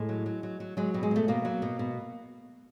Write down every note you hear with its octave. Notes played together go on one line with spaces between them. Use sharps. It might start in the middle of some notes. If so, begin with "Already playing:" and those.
Already playing: A2 G#3
F#3
F#3
F#3
F#3
F#3 G#3
B2 G3
G#3
B2 A3
B2 A#3
F#3
B2
B2